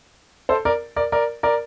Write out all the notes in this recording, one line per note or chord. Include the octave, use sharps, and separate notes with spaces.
A4 C5
A#4 D5
A#4 D5
A#4 D5
A#4 D5